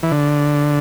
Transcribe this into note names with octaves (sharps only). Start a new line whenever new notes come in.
E3
D3